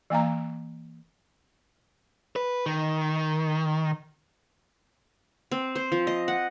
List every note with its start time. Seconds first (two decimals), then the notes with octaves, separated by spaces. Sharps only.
0.10 E3 A#3 F5 A#5
2.36 B4
2.66 D#3
5.51 C4
5.75 C5
5.92 F3
6.07 D#5
6.28 F#5